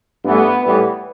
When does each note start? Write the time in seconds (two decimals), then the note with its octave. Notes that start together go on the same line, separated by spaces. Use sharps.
0.24 G2 E3 A3 B3
0.64 A2 E3 G3 B3